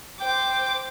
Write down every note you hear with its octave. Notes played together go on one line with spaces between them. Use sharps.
C5 G5 D6